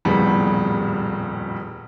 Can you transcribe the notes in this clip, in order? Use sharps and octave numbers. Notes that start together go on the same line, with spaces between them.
D#1 F2 A2 C#3 G3 B3